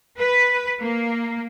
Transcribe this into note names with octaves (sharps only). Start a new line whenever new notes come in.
B4
A#3